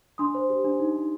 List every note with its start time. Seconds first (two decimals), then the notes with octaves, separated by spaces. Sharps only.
0.18 D4 C6 D#6
0.35 C5
0.50 G4
0.64 D4
0.80 D#4
0.96 D#4